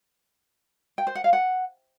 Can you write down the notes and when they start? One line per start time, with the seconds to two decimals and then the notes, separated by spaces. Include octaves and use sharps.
0.98 G5
1.07 C5
1.15 F#5
1.24 F5
1.33 F#5